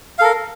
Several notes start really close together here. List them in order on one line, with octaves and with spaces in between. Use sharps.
F5 A4 A#4